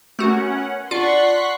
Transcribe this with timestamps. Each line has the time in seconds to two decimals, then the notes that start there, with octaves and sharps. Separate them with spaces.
0.19 A3 B3 C#4 F#4 A#4 F#5
0.91 D4 F4 D5 F#5 C6 C#6 F#6 B6